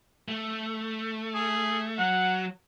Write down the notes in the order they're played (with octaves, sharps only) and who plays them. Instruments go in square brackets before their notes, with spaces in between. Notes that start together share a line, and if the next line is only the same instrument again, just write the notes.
[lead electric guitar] A3
[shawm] G#4
[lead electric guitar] F#3 [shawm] F#5